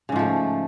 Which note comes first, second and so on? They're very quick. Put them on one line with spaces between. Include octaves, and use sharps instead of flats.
C#3 G#2 F3 A3